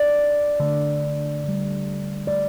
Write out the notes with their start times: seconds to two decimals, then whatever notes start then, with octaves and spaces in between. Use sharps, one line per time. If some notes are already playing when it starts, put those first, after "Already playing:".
Already playing: D5
0.60 D3 A3
1.44 D3 G3
2.27 D3 A3 D5